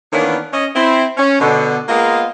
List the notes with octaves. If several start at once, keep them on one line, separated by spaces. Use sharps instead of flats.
D#3 E3 A#3 B3 C#4 D4
C#4 D#5
C4 E4
C#4
B2 D3
G#3 A#3 B3 F4 A#4 D#5